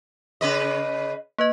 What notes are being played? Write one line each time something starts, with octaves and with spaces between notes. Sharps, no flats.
C#3 B4 D#5
A#3 B4 D#5